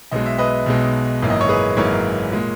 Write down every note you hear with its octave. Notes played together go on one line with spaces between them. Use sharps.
B1 B2 G#3 D#5
E5
B4 D#5
B1 B2 G#3
G#1 F#2 E3 A#3
D#5
C#5
G#4 B4
G#1 F#2 E3 A#3 A#4 C#5
A#2 G#3